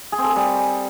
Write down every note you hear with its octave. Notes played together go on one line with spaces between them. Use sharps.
G#4
C4
A4
G#4
G3